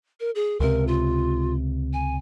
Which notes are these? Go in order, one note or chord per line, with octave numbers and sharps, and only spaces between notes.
A#4
G#4
C#2 C3 A#4
F4
G#5